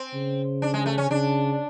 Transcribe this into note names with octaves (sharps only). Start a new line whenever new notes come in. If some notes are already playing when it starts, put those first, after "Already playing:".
Already playing: C4
C#3
D4
G#3
A3
C#4
C#3 D4